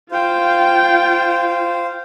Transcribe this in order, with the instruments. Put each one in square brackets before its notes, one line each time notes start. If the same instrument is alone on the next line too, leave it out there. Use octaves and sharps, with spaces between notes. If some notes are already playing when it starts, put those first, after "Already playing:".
[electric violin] F4 G5 [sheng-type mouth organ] C5 F5